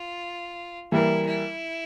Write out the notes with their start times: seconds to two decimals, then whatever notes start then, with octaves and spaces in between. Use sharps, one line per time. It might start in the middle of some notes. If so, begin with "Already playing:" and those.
Already playing: F4
0.92 E3 G3 A#3 E4
1.27 E4